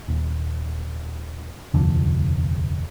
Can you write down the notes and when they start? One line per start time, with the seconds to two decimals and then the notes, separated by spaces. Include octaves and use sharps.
0.08 D#1
1.74 D#1 C2 F2 D3